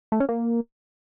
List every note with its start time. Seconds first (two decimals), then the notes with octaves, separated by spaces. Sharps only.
0.12 A3
0.20 C#4
0.29 A#3